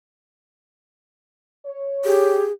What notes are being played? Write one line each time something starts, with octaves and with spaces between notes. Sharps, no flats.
C#5
G4 G#4